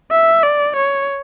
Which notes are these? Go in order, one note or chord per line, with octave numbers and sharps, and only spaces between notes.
E5
D5
C#5